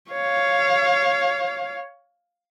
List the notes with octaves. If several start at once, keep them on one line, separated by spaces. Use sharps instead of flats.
C#5 F5